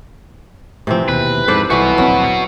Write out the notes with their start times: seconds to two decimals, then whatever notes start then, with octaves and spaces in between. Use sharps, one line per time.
0.87 A2 C3 E3 F3 C4
1.08 D#2 B2 B4
1.47 F2 G#2 A4 C5 D5
1.70 C2 E3 F#3 F#4 B4
1.98 D1 A#1 F#3 C4